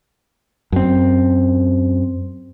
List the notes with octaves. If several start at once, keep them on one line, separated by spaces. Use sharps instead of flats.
F#2 C4